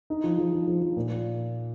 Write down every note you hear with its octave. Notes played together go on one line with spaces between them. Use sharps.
D#4
F3
F3
F3
F3
F3
A#2